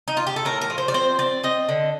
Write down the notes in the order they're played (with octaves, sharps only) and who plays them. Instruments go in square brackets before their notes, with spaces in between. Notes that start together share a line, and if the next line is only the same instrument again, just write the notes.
[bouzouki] D#4
F4
G4
A4
A2 A#4
A#4
F3
C5
D5
C4 C5
C4 D5
C4 D#5
D3